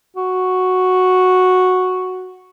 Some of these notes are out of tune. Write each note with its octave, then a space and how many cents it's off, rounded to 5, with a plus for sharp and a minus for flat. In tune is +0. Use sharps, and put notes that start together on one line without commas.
F#4 -5